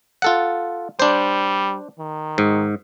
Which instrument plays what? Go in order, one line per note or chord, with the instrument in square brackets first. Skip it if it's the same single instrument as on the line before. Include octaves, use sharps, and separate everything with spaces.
[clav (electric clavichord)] F4 A4 F#5
[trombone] G3 [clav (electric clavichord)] D4 C5
[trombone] D#3
[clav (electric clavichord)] G#2